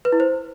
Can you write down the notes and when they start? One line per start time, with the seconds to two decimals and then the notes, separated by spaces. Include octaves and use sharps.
0.05 B4
0.12 E4
0.20 C5